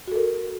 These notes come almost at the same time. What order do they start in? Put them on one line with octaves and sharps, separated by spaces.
F#4 A4 A#4